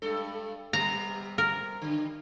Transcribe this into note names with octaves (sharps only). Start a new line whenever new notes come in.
G2 G#3 A4
C3 G3 B3 A#5
A#4
G2 D3